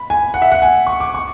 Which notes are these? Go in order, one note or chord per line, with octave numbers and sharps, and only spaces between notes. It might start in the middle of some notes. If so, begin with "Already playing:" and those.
Already playing: B5
G#5
F#5
E5
F#5
G#5
C#6
D6
C#6